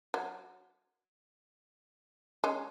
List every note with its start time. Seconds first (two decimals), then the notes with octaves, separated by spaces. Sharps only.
0.14 F#3
2.44 G#3 C#4